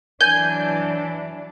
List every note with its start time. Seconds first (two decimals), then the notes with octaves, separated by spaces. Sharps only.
0.21 E3 F#3 D4 G#5 G6